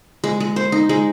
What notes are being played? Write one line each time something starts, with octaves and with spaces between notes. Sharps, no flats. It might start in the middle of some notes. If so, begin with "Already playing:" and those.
G#3
G#3
C5
D#4
G#3